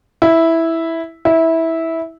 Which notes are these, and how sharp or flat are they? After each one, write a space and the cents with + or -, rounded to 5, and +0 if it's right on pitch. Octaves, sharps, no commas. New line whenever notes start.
E4 -5
E4 -15